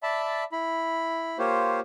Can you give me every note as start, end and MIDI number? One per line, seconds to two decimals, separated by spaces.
0.03 0.44 74
0.03 0.44 76
0.03 0.44 81
0.03 0.44 83
0.52 1.38 64
0.52 1.38 83
1.39 1.80 58
1.39 1.80 65
1.39 1.80 67
1.39 1.80 72
1.39 1.80 73